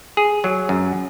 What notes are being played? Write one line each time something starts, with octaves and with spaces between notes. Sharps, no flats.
G#4
F#3
F#2